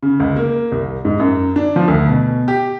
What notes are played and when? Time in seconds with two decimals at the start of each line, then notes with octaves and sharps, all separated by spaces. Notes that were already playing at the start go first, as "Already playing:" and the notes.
0.03 C#3
0.20 C#2
0.36 A#3
0.72 C2
1.05 G#2
1.20 F#2
1.56 D4
1.76 F3
1.88 D2
2.08 B2
2.48 G4